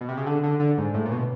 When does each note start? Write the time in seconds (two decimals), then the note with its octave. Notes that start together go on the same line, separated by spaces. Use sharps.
0.01 B2
0.09 C3
0.17 C#3
0.26 D3
0.43 D3
0.60 D3
0.78 G#2
0.94 A2
1.05 A#2
1.11 B2